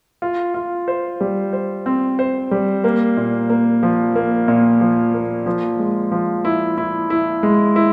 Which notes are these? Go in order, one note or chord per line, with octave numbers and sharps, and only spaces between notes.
F4
F4
C5
G3
C5
C4
C5
G3
A#3
A#2
A#3
F3
A#3
A#2
F3
A#3
F3
G#3
F3
E4
E4
E4
G#3
E4